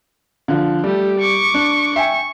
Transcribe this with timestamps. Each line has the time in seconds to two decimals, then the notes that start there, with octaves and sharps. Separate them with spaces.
0.48 D3 F3
0.84 G3 A3 G4
1.20 C#6 D6
1.54 D4
1.96 E5 G5 G#5 C#6